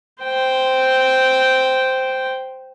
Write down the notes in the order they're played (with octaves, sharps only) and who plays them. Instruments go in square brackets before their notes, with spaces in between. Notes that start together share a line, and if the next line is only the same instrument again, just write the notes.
[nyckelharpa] C5 G5